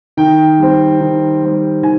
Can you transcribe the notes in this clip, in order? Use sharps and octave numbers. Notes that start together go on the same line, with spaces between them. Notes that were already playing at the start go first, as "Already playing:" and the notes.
D#3 G5
G3 C4
D#3
G3 C4
D#3 G#5